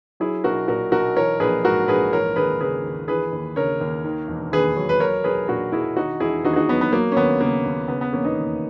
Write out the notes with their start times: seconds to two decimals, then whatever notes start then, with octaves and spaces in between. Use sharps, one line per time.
0.20 F#3 E4 G#4
0.44 B1 F#4 A#4
0.68 A#2 F#4 A#4
0.92 B1 F#4 A#4
1.16 E3 A#4 C#5
1.40 A#1 G#4 B4
1.65 G#2 F#4 A#4
1.88 A#1 G#4 B4
2.13 E3 A#4 C#5
2.36 D#2 G#4 B4
2.61 C#3 G#4 B4
2.85 D#2
3.08 E3 G#4 B4
3.33 D#2
3.56 C#3 A#4 C#5
3.81 D#2
4.04 D#3
4.28 E1
4.52 D#2 G#4 B4
4.76 F#3
4.89 B4
5.00 F#3 A#4 C#5
5.24 B1 G#4 B4
5.48 A#2 F#4 A#4
5.72 B1 E4 G#4
5.96 D#3 D#4 F#4
6.20 E1 E4 G#4
6.44 D#2 D#4 F#4
6.53 G#4
6.56 D#4 F#4
6.69 F#3 B3
6.81 B3
6.92 F#3 A#3
7.12 C#4
7.16 D#2 B3
7.41 C#3 A#3
7.65 D#2
7.88 C#3 B3
8.01 B3
8.13 E1 A#3 C#4
8.24 B3 D#4
8.37 D#2